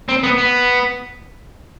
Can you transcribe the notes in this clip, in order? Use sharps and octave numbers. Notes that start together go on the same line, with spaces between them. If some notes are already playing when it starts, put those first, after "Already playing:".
C4
B3
B3